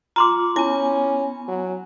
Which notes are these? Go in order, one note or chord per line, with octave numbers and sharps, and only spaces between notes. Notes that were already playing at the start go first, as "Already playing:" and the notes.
F4 A#5 C6 D6
B3 C#4 E4 G#5
F#3